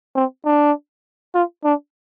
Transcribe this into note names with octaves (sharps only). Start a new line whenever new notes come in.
C4
D4
F4
D4